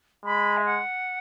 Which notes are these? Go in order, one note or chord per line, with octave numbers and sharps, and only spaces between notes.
G#3 B5
E5
F#5